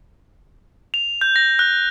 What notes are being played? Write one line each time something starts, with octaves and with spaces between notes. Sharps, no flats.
F7
G6
A#6
F#6